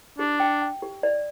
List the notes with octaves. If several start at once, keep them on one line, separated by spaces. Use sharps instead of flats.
D4 G4
G5
G5
G4
D5